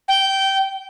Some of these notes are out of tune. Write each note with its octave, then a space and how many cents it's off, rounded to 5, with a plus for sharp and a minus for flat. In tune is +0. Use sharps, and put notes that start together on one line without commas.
G5 -15